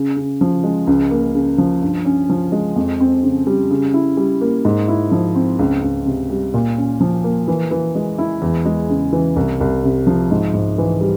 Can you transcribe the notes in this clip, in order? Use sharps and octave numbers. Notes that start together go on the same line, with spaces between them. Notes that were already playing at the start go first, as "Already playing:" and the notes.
Already playing: C#3
C#3
F3
G#3
C#2
A#3
C#3
F3
G2
C#4
F3
G#3
F2
C4
C#3
G3
C#3
E4
G3
A#3
G#2
E4
F3
C4
C#2
C#2
C3
G3
A#2
C#4
F3
A#3
E3
E3
G#3
E4
E2
G#3
C#3
E3
C2
C2
C3
F3
G#2
G#2
E3
G3